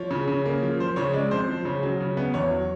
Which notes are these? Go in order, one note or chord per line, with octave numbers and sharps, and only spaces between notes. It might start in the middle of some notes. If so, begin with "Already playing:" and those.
Already playing: F3 C#5
C#3
C#3
A#3
F3
F3 C5
C#3 C#5
G#3 D5
F2 C5
F3
C#3
F#3
C#3
B3
E2 C#5
F#3